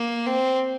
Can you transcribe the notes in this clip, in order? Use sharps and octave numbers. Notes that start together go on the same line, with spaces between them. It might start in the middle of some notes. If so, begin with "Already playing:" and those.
Already playing: A#3
C4